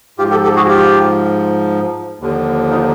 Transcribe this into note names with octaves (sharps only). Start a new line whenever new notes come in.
G#2 F3 F4 G4
G4 A4
G4 A4
F#4 G#4
F4 G4
D#2 D3 F3
D#4 F4